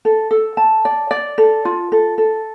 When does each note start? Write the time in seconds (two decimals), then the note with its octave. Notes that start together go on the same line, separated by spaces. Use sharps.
0.05 A4
0.31 A4
0.57 A5
0.85 D5
1.11 D5
1.38 A4
1.65 F4
1.92 A4
2.18 A4